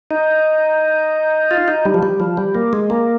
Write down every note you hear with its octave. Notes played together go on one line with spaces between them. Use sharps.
D#4
F4
D#4
G3
F3
G3
F3
G3
A#3
G#3
A#3